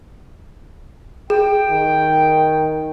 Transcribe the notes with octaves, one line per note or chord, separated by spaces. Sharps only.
G#4 G5
D#3